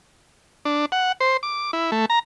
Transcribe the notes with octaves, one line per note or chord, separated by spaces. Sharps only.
D4
F#5
C5
D6
E4
A3
A#5